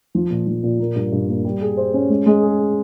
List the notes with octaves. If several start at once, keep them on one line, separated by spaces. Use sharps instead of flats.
F3
A#2
F3
A#2
A#3
G2
G2
A#3
G3
G#4
C5
C#4
G#3
G#3
G#4
G#4